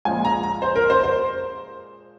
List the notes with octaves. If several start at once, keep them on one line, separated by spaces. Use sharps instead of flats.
A#2 F3 G#3 G#5
A#5
A#5
C5
A#4
C5
C5